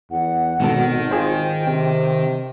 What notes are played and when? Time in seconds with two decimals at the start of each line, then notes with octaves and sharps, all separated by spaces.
0.11 E2 F#5
0.60 G#1 G#2 B2 D#3 A4
1.11 F4 G#4 C5 G5
1.67 C3 C4